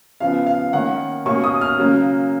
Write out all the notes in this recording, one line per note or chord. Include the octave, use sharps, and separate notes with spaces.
C#3 F3 B3 F5
F5
D#3 A#3 C#4 F#5
B2 A#3 C#4 C#6
D#6
F6
C#3 F#3 A#3 C#4